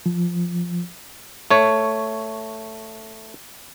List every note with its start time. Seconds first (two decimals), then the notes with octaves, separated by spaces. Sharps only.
0.06 F3
1.51 A3 C#5